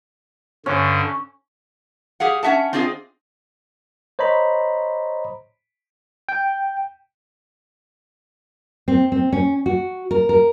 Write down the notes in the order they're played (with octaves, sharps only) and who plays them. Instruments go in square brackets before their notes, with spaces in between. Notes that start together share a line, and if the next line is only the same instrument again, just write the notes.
[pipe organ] G2 D3 [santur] C#4
[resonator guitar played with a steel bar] G4 G#4 F5 F#5
C#4 F#4 E5 F#5 A5
C4 D4 F4 G#4 D#5
[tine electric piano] C5 C#5 D#5 A#5 B5
G5
[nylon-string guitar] C4
C4
C#4
F#4
A#4
A#4